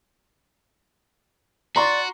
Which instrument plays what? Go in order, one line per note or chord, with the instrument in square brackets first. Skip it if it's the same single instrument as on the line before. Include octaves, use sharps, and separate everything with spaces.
[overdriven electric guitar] F#4 [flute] D5 [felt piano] A#5 C6 C#6